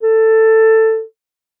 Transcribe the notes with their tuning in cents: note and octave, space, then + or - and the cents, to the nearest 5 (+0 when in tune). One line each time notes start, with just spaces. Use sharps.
A4 +15